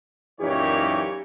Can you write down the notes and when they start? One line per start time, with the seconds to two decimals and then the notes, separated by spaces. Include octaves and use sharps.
0.41 F#2 A#2 E3 D#4 G4 C#5